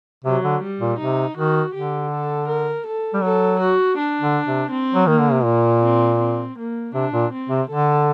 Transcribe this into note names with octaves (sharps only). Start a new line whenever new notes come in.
C3 F#3
D3
G3
A#2
C3 D#4
D#3 F#4
D3 G4
A4
A#4
A4
G3
F#3 A4
F#4
D4
D3
C3
C4
F#3
D#3 A#3
D3
C3
A#2 A#3
C4
C4
A#3
C3 D4
A#2
C4
C3
D3 A4